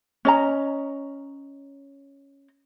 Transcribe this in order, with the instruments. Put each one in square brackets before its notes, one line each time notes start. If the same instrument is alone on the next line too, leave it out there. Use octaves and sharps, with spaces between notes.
[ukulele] C#4 D#5 A#5